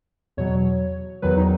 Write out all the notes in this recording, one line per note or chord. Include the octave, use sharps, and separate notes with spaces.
E2 B2 F#3 C#5
E2 D#3 F#3 B4
D#4